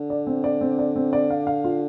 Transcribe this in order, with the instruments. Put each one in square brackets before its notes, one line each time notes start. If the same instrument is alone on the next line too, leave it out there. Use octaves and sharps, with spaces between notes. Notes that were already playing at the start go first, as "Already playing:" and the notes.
Already playing: [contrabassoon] D3
[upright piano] D5
C4
D5
C4
D5
C4
D5
F5
F5
F4